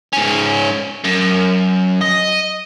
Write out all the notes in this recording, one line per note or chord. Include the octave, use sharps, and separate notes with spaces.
G#2 C#4
F#2
D#5